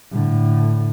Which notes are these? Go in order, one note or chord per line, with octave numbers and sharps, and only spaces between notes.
A2 D3